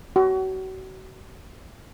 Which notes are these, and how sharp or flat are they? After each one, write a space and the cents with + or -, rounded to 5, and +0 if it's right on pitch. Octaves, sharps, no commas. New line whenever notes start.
F#4 +35